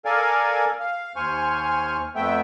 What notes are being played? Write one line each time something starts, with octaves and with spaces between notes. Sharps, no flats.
A4 A#4 D5 F5 G#5
F5
D#2 C5 G#5 C#6 F6
F2 A3 B3 E5 G5